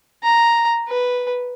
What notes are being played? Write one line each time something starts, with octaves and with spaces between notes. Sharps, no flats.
A#5
B4